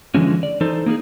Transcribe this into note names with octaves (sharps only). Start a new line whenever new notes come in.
D3 E3 F3 G#3 C#4
D5
E3 D#4 A4 C5
A#3 D#4 E4 G#4